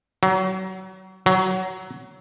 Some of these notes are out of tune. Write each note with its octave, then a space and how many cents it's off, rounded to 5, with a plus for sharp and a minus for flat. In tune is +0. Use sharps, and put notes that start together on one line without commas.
F#3 +30
F#3 +15